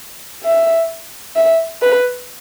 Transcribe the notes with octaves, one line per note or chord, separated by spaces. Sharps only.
E5
E5
B4